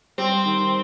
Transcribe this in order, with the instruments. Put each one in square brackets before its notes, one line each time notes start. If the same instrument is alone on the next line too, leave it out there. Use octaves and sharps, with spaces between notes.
[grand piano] G3 [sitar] C4
[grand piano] D#3